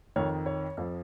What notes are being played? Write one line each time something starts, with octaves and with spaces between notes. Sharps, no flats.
F2 D#3 C#5
C#5
F2 F3